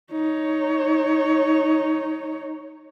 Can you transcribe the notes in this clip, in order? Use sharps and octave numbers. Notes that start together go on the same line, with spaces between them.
D#4 C#5